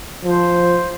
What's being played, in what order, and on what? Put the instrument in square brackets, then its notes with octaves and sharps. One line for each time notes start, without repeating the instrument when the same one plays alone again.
[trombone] F3 [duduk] C5